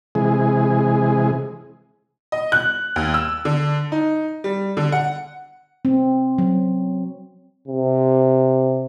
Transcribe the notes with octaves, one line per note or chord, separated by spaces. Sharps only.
C3 E3 G#3 G#4
D#5
F#6
D#2
E6
D3
D#4
G3
D3
F#5
C4
F#3
C3